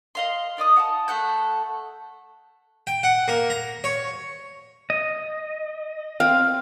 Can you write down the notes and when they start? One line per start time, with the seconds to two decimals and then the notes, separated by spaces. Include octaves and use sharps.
0.15 D#5 F5 C6
0.57 D#4 D5 D#5 D#6
0.76 F#5 G#5 A5
1.08 A3 A4 F#5 G6
2.87 G5
3.03 F#5
3.28 A#3
3.50 A#5
3.84 C#5
4.90 D#5
6.20 C4 F5